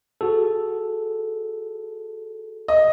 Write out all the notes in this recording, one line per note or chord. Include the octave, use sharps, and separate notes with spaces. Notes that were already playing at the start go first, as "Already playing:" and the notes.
F#4 G#4 A4
D#5